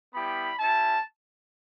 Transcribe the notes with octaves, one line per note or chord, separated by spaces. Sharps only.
G3 B3 E4 G4 B5
C#4 E4 G4 A5